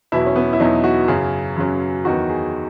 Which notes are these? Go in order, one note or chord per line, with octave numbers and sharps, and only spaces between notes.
E2 B2 F#3 E4
C#4
B3
E4
E2 B2 F#3 D#4
F#4
F#2 C#3 F#3 G#4
F#2 C#3 F#3
E2 D#3 F#3 F#4
G#4